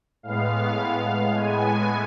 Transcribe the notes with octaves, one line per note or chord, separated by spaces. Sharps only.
A2 G#3 B3 F5
A2 G#3 B3 G#5